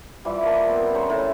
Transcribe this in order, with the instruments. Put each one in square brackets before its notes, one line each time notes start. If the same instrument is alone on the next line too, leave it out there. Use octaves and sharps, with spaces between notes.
[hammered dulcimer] E3 F3 G3
A#3 A5
B3 C4
C#3 C5 A#5 C#6
A2